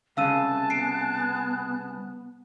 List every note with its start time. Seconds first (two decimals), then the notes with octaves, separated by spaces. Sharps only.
0.17 C2 C#3 F5 G#5 A5 E6 F#6 D#7
0.70 B3 C7 D7